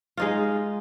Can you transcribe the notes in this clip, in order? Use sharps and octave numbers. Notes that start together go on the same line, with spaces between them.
G#3 D#4 F4